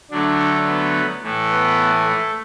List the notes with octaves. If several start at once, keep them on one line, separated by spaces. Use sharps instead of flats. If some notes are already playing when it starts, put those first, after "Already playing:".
D3 F#3 A3 D4
B3
A2 E3 A3
B3
A3